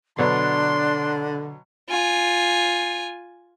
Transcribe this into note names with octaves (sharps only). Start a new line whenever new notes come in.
B2 D3 F#3 B3 D4 C6
F4 G#5